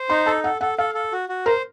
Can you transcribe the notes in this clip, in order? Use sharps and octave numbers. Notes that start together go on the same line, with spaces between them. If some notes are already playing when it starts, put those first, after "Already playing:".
Already playing: C5
D#4 C6
A4 A5
A4 F#5
A4 F#5
A4 F5
A4
F#4
F#4
A#4 C5